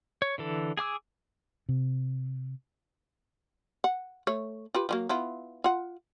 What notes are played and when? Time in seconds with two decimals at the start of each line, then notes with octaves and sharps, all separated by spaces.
0.22 C#5
0.38 D3 E3 A4
0.77 G#4 G#5 D6 E6
1.69 C3
3.84 F#5
4.27 A3 C#5
4.74 F4 G4 B4
4.89 F3 F#3 A#3
5.09 B3 E4 F4
5.64 F4 F#5